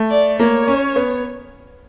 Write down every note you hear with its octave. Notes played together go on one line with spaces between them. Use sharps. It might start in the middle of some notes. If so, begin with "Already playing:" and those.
Already playing: A3
D5
A#3 C#5
C#4
B3